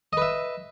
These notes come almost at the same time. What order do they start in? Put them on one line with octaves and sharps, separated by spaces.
D#5 B4 E5